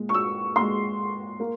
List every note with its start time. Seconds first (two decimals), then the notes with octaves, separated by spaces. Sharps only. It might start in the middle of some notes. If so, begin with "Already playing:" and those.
Already playing: A#2 G#3
0.09 C#6
0.14 E6
0.56 A#2 G#3 C6
1.40 A#3